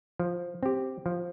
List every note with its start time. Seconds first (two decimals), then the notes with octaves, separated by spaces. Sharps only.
0.20 F3
0.63 C4 G4
1.06 F3